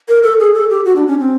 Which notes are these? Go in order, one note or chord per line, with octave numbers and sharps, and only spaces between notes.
A#4
A4
G#4
A4
G4
F#4
D4
C#4
C4